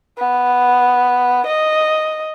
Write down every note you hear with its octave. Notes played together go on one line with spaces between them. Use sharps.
B3
D#5